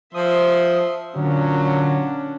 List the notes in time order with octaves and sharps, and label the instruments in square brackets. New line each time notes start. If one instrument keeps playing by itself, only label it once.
[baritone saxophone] F3 [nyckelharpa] E5 C6 [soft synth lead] D#6
[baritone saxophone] A#2 [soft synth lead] D3 [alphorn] F#3 [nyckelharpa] C#4 D4